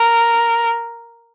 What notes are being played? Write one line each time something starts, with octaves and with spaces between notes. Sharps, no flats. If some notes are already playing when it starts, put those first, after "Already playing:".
Already playing: A#4